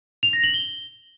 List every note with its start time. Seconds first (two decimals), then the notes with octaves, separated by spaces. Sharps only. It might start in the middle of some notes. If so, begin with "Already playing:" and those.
0.23 F7
0.33 A#6
0.44 F#7
0.54 G7